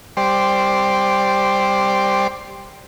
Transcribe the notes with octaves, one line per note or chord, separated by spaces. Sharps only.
G3 C5 D5